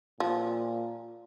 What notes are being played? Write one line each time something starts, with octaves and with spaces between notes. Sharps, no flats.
A#2 F3